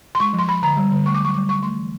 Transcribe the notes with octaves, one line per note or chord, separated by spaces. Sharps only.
C6
G#3 C#6
F3
C6
F3 B5
D3 A#5
G3
D3
A3 C#6
D6
F#3 C#6
G3 D6
D3 C#6
A3 C6
E3